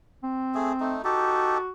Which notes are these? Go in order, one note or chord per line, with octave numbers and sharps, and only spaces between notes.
C4
A3 G#4
A3 D#4
D#4 F#4 G4 A4